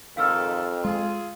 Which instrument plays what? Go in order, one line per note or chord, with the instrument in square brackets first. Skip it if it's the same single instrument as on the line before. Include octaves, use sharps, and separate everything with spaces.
[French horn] F2 [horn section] G#2 D#3 A4 [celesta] F5 E6 F6
[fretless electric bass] G#3 [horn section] F4 G#4